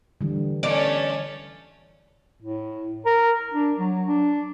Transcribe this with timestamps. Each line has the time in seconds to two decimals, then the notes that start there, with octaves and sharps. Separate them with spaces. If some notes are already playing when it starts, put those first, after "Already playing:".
0.21 D3 E3 G3
0.63 A3 C#4 D5
2.42 A2
3.05 A#4
3.52 D4
3.78 F#3
4.07 D4